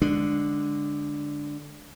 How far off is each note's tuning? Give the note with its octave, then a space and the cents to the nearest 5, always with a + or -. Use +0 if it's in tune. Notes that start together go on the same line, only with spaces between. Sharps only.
D3 +0 G#3 +0 D4 +0